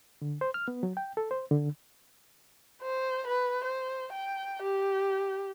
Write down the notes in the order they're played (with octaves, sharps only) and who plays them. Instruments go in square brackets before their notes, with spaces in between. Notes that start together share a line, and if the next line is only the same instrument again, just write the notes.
[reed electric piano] D3
C5
F6
B3
F#3
G5
A4
C5
D3
[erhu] C5
B4
C5
G5
G4